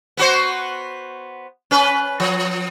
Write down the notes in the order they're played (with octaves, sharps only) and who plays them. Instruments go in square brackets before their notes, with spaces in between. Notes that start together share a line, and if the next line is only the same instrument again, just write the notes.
[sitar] B3 F#4 C5
C#4 B4
F3